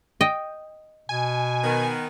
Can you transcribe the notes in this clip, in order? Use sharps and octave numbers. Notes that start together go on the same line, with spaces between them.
D#5 G5
B2 G#5
D#3 B3